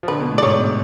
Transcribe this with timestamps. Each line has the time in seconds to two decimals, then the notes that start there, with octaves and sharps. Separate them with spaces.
0.03 F3
0.08 D3 B4
0.20 B2
0.31 A2
0.38 D5
0.42 G#2 C#5